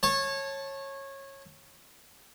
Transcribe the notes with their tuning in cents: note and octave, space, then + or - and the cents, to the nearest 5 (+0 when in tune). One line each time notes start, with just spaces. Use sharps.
C#5 -20 A5 -5